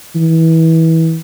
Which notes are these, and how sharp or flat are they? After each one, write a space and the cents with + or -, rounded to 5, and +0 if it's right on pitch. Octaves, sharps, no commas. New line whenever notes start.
E3 -25